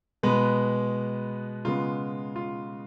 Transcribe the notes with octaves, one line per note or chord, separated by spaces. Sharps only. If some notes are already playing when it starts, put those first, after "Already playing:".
B2 G#3 B3 B4
C#3 G#3 B3 F4
F4